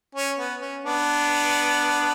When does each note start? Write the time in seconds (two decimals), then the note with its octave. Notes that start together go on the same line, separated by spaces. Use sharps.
0.15 C#4
0.38 B3
0.61 C#4
0.84 B3 D4